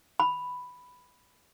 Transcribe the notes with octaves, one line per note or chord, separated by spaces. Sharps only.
B5